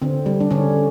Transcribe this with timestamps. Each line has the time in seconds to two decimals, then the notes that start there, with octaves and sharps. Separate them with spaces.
0.02 D3 C4
0.26 G3
0.40 D4
0.51 D3 C#4